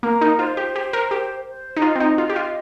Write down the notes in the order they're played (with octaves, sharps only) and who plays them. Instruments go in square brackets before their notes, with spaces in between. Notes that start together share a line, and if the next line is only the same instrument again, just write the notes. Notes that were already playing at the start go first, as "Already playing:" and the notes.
[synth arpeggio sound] A#3 [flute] A#4
[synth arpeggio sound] D#4
[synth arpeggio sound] F4 [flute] C5
[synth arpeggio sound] G4
G4
A#4
G4
[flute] C5
[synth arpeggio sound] D#4
[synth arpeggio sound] F4 [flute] D#5
[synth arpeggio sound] C4
D#4
F4
G4
F4